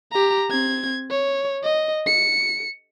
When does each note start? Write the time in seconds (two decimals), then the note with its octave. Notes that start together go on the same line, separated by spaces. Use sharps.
0.12 G4 A#5
0.51 C4 G#6
1.11 C#5
1.63 D#5
2.07 C#7